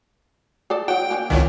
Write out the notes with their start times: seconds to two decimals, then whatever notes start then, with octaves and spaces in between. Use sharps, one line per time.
0.70 G#4 A4 D5
0.88 F#3 F#5 G5
1.10 D3 A#3 C#4
1.30 G#1 C#2 D#3 E3 F#3 C#5